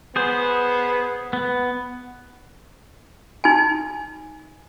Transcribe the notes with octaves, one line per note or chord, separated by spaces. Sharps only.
B3 G#4 C5
B3
D#4 G#5